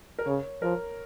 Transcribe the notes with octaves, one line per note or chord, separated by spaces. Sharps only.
A#4
C#3 C#5
F3 A#4